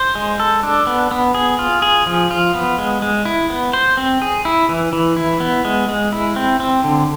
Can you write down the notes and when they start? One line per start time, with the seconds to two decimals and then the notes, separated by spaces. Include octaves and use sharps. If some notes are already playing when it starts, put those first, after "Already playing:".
Already playing: C5
0.15 G#3
0.40 A4
0.63 D4
0.87 B3
1.11 B3
1.35 G#4
1.59 F4
1.82 G#4
2.07 F3
2.31 F4
2.55 B3
2.78 G#3
3.02 G#3
3.25 E4
3.50 B3
3.73 C5
3.97 C4
4.22 G#4
4.45 E4
4.69 E3
4.93 E3
5.17 E4
5.40 B3
5.65 G#3
5.89 G#3
6.13 E4
6.36 C4
6.60 C4
6.84 D3